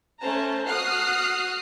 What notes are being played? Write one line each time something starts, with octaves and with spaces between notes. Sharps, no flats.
A3 C#4 C5 A5 A#5
F#4 D#6 F6 F#6 C7